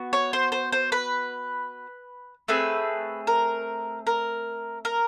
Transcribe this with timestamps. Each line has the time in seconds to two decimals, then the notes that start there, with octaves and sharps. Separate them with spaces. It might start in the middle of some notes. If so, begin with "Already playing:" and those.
Already playing: B3 F#4
0.13 C#5
0.33 C5
0.52 C5
0.72 C5
0.92 B4
2.48 A3 C4 G#4 B4
3.27 A#4
4.07 A#4
4.85 A#4